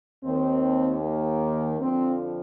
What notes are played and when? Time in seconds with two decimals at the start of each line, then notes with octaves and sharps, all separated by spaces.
0.23 D#2 D#3 C4
1.01 A#3
1.79 F2 D3 F3 C4